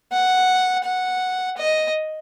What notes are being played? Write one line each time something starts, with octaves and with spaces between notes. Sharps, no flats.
F#5
F#5
D#5